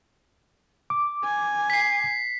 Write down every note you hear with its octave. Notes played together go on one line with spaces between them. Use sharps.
D6
G#5
B6 C7